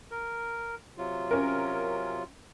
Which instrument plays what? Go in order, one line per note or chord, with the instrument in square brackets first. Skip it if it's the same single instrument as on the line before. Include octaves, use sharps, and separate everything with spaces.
[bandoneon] A#4
C3 F#3 F4
[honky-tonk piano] C#4 A#4